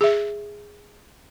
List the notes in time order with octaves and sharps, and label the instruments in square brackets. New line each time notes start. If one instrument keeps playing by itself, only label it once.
[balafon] G#4 E5